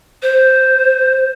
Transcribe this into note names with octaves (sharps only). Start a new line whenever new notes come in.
C5